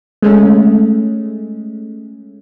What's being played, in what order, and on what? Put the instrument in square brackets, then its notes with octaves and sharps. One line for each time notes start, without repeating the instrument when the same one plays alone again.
[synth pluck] G#3 A3 C#4